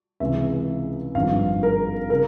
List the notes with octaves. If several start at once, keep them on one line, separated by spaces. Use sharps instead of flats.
C#2 C3 E3 G#3 E5
G#1 G2 F3 F5
A#4
C#3 A#4